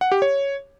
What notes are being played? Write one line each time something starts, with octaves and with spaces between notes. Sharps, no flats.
F#5
G4
C#5